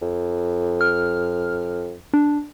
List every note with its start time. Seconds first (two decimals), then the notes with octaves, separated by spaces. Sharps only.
0.02 F2
0.81 F6
2.14 D4